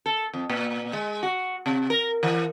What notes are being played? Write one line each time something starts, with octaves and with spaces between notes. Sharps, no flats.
A4
F2
A#2
G#3
F#4
C3
A#4
E3